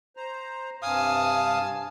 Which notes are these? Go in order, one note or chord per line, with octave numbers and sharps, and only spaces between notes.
C5 A#5
G2 C3 F5 G#5 A5 D#6